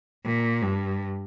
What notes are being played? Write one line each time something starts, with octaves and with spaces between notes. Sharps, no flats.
A#2
G2